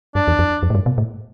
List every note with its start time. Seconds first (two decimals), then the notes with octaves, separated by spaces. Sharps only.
0.15 G2 D4
0.28 E2
0.39 F2
0.63 F2
0.70 A2
0.75 G2
0.86 B2
0.98 A2